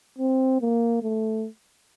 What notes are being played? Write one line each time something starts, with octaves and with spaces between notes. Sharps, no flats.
C4
A#3
A3